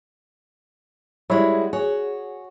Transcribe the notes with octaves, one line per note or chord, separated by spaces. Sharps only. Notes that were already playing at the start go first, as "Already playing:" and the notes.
G3 G#3 E4 F#4 C#5 D5
F#4 G#4 C#5